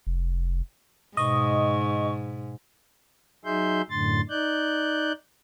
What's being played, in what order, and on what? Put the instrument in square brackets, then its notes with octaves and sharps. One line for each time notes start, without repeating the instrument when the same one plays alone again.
[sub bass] F1
[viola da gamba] G#2 [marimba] B2 [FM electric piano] D#5 [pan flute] C#6
[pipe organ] F#3 D#4 G#4 E5 C6 G6
F#2 A2 D3 C6 A6
D#4 D5 F#6 G6